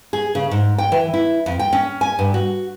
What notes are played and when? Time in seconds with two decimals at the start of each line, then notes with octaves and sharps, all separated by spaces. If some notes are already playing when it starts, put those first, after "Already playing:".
0.13 G#4
0.35 C#3
0.51 G#2
0.78 G5
0.92 E3
1.13 E4
1.46 F2
1.59 G5
1.73 C#4
2.01 G#5
2.19 G2
2.34 F#4